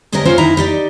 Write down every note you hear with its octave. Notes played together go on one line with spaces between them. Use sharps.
D2 G2 C#4 G4 A#4 D#5
C#4 F4 A#4 C5 C#5
F#2 D#3 E4 A#5
D#4 G4 D5